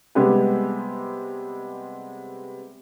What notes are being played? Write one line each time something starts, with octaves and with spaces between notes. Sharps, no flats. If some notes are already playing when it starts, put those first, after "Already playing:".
C3 G3 G#3 B3 G4 B4